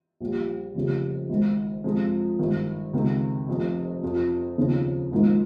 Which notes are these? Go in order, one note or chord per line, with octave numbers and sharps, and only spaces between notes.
A#1 A#2 G3
F1 F2 C#3 G3
G#1 G#2 D#3
F2 C3 F3 G#3
G#1 G2 D#3
C#2 C3 D#3
F1 F2 C3
F2 C3 F3
D#2 C#3 F3 C4 D#4
G#1 G#2 F3 A#3 D#4